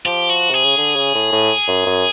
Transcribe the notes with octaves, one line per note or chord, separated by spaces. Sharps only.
F3 G4
F#4
C3 G#4
C#3
D3
C#3
A2
A2
F#2
F#2